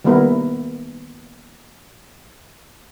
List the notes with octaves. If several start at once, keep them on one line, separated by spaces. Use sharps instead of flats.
D#3 G3 A#3 B3 E4 A#4